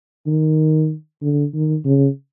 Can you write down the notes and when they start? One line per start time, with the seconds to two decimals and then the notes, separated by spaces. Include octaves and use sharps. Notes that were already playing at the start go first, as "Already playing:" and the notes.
0.27 D#3
1.22 D3
1.54 D#3
1.85 C#3